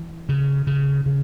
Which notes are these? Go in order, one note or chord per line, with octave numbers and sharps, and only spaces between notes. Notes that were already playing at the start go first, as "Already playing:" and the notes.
Already playing: E3
C#3
C#3
C#3